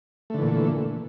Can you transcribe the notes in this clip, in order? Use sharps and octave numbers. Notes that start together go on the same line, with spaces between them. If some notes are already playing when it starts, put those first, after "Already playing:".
A#2 D3 E3 A3